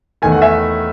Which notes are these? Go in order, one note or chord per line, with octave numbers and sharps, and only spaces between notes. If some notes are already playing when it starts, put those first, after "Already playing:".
E2 D#3 A3 G#5
F#5
E5 G#5